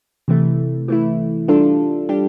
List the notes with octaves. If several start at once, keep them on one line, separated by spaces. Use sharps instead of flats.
C3 E3 A3
E3 A3 E4
G3 D4 F4 A4
G3 D4 G4